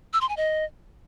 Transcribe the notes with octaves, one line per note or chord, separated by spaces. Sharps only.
E6
C6
G#5
D#5